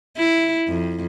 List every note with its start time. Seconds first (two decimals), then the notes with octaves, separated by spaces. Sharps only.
0.18 E4
0.68 F2